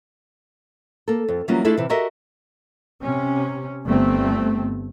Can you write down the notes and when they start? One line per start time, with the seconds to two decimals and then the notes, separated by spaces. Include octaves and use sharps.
1.08 A#3 A4
1.28 F2
1.48 E3 F#3 G3 A#3 C#4 F4
1.65 A3 D4 E4 F4 G#4 A4
1.77 C3 E3
1.90 F#4 G4 A4 A#4 D#5 E5
3.02 C3 C#4
3.85 G1 A3 C4